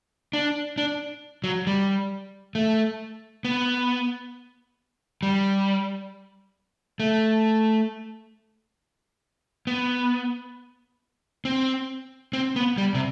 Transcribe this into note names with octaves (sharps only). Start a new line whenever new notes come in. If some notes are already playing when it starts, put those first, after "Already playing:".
D4
D4
F#3
G3
A3
B3
G3
A3
B3
C4
C4
B3
G3
C3